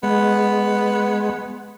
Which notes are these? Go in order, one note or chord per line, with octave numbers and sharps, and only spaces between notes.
G#3 B3